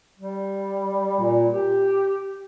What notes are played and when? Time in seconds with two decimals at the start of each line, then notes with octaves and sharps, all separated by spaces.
0.19 G3
1.19 A#2
1.52 G4